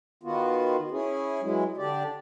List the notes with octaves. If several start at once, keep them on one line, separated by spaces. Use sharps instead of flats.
D#3 B3 F4 F#4
C#4 E4 G#4
E3 F#3 G#3 E4
D3 D4 G4 D5